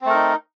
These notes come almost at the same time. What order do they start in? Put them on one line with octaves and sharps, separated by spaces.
C4 A3 A#4 D#4